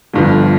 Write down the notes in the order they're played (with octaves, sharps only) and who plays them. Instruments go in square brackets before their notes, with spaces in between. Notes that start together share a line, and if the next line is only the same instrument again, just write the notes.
[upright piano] G1 G2 D3 F3